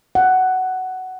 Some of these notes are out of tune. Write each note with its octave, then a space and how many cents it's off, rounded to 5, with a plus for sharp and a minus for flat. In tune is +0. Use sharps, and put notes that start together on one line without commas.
F#5 +10